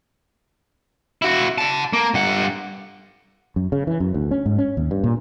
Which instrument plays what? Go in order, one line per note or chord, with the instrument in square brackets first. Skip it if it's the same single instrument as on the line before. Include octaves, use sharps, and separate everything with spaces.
[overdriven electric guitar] E4 F#4
F#5 A5
A#3
G2 F#5
[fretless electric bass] F#2
C#3
E3
F#2
D2
C#4
G#2
C#4
D#2
G2
A#2